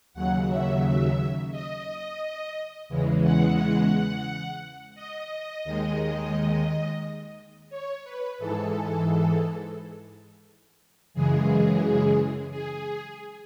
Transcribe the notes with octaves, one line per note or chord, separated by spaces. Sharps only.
D#2 C#3 F#3 F#5
E5
D#5
E2 C#3 E3 G#3
F#5
D#5
D#2 D#3 G#3
C#5
B4
G#2 E3 G#3 A4
F#2 C#3 E3 G#3 G#4
G#4